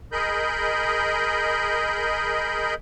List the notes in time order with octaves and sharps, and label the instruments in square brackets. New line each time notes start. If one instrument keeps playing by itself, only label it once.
[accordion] G#4 A#4 D#5 B5 G6